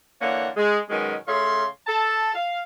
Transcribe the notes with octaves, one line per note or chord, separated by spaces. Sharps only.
D3 E3 A#3 C#5 F#5
G#3
B2 D#3 F#3 G#3 C#4
C#3 A3 C#5 F5 C6
A4 A5
F5